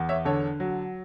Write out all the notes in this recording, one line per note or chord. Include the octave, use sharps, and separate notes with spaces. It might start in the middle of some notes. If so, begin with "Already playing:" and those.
Already playing: E2
C#5 E5
D3 A4 C#5
F#3